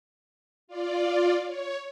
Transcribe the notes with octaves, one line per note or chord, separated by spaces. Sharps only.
F4 D5
C#5